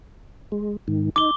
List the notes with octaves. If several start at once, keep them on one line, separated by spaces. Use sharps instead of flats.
G#3
G#2 D#3
D#4 D6 G7